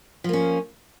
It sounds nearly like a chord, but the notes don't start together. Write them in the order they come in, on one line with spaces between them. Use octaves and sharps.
F3 A#3 C#4